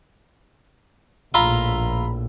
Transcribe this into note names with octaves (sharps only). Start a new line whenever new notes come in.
A#1 A2 F4 A#5 B5 E6